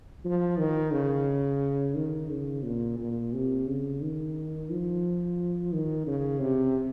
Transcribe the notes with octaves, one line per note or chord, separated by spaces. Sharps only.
F3
D#3
C#3
D#3
C#3
A#2
A#2
C3
C#3
D#3
F3
D#3
C#3
C3